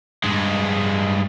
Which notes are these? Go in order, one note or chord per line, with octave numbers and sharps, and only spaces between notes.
G2 G#3